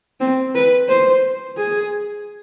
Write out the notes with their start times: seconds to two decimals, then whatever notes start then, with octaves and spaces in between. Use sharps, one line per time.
0.20 C4
0.55 B4
0.89 C5
1.57 G#4